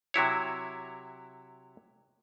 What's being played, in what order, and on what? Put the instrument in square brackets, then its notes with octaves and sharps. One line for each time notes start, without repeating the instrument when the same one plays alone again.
[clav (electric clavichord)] C3 F#3 E4 C#5